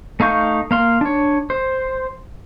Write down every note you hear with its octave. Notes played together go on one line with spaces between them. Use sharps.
A3 D#4 F5 C#6 G6
A#3 F5 C6
D4 C#5
C5